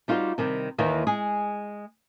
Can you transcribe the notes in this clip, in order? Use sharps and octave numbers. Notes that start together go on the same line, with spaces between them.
G3 D#4 F4 F#4 C5
C3 D#3 G3
D#2 D#3 E3 A#3 D#4
G#3 G#4